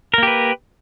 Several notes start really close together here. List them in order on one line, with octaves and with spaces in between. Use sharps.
A#4 A#3 G4 B4